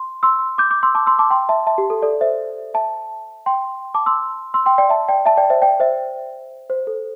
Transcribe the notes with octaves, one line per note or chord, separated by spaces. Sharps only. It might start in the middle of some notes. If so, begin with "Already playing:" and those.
Already playing: C6
C6 E6
D6 G6
D6 G6
C6 E6
A5 D6
C6 E6
A5 D6
G5 C6
E5 A5
E5 A5
G4
A4
A4 D5
C5 E5
E5 A5
G5 C6
A5 D6
C6 E6
C6 E6
G5 C6
D5 G5
E5 A5
D5 G5
E5 A5
D5 G5
C5 E5
D5 G5
C5 E5
C5
A4